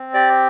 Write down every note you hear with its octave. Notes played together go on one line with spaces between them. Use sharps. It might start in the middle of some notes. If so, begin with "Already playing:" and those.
Already playing: C4
G4 D5